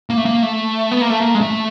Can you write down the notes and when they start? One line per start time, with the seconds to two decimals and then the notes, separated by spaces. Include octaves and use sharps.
0.10 A#3
0.17 A3
0.25 A#3
0.42 A3
0.92 B3
1.01 A#3
1.10 A3
1.20 A#3
1.35 G#3
1.41 A3